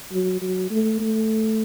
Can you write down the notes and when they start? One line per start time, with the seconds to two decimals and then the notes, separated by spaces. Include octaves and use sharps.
0.12 F#3
0.41 F#3
0.71 A3
1.00 A3